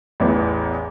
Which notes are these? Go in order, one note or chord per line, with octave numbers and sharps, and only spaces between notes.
A1 E2 E3